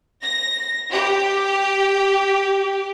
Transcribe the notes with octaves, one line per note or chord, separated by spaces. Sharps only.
A#6
G4